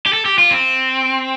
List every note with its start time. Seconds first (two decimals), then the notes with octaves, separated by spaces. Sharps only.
0.07 G4
0.13 A4
0.25 G4
0.38 F4
0.51 C4